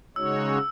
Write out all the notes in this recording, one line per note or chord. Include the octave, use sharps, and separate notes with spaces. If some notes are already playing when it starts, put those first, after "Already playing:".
C#3 G#3 D#4 F#4 C#5 E6